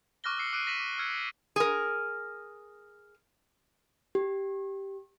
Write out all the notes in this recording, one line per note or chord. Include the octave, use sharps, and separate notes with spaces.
C#6 D6 F6 F#6 A#6 G7
E6 F6 C7 C#7
D6 F#6 C7 D7 D#7
A#6 B6 D#7 E7 F#7
D6
E6 F6 G#6 C#7
G#4 A#4
G4